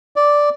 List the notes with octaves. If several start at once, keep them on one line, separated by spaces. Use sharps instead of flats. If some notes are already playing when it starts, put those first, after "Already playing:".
D5